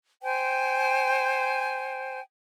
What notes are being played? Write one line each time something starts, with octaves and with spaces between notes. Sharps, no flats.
C5 G5 G#5